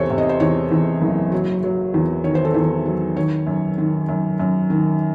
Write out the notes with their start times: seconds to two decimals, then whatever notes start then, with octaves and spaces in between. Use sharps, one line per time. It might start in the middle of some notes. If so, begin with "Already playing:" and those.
Already playing: E2 C3 A4 C5 C#5
0.10 C3
0.18 D#5
0.29 C5
0.40 E2 C#5
0.72 E2
1.01 F#1
1.32 F#3
1.64 F#3
1.94 E2
2.24 D#3 C#5
2.35 C5
2.45 A4
2.54 E2 C5
2.86 F#3
3.16 D#3 C#5
3.47 F#2
3.78 D#3
4.09 F#2
4.40 F#2
4.70 D#3